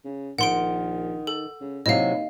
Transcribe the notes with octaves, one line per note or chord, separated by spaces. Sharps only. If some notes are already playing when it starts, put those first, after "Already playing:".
C#3
A#1 D#3 F#5 C6 D7
A4
C#3
D#2 C3 F#3 E4 D#5 F5